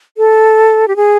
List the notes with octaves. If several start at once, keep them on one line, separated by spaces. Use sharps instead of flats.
A4
G4
G#4